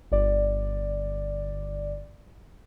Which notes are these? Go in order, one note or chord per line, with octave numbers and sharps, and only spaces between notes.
G1 D5